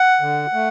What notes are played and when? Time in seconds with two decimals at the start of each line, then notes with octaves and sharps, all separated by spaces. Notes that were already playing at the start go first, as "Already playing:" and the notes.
Already playing: F#5
0.21 D3
0.53 A3